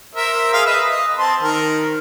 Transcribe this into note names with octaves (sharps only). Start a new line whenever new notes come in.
A#4 C5 E5
G#4 F5
B4 D#5 E5
D#5
C4 A5 C6
D#3 A#4